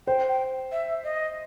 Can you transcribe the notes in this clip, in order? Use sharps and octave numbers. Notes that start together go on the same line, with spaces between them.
C5 G5
G5
E5
D#5